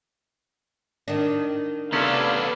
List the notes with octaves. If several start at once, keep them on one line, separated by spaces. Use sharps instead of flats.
D#3 D4
C3 A3 B3 C#4 A4 B4 D5 F5